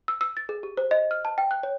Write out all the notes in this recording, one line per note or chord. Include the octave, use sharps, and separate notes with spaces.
E6
E6
A6
G#4
G4
C5
D#5
F6
A5
G5
F#6
C#5